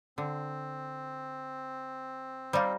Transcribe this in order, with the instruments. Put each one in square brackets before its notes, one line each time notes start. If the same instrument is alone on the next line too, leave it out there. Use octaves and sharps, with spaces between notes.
[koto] D3 [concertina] C4
[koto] G3 D#4 [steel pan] C5 D5 F5